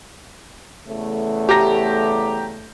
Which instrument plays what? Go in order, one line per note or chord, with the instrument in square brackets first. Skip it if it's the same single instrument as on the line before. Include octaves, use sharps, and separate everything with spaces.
[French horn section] E2 C#3 A3
[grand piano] G4 A#5 A#6